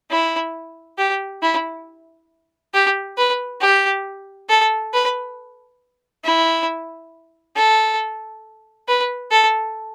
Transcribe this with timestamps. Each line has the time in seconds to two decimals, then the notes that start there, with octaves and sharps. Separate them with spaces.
0.11 E4
0.98 G4
1.42 E4
2.74 G4
3.18 B4
3.61 G4
4.49 A4
4.93 B4
6.24 E4
7.56 A4
8.88 B4
9.32 A4